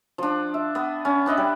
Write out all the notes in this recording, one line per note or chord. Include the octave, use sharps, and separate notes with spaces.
F3 D4
E5
B3
C#4
D4 B4 D#5 E5
G3